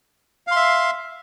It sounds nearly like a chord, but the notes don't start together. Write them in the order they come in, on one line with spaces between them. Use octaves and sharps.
F5 C6 E5